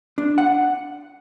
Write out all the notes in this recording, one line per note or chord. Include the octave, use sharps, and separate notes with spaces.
D4
F#5